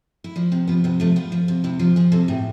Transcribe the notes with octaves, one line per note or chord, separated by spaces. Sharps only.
E4
F3 D4
C3 C4
F3 B3
C3 B3
F3 A3
F3 B3
F3
C3
C3 E4
F3 F4
F3 G#4
C3 A4
A2 G#4